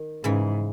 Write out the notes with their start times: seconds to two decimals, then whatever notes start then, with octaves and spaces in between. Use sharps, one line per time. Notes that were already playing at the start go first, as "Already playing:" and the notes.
Already playing: D#3
0.24 G#2 C#3 E3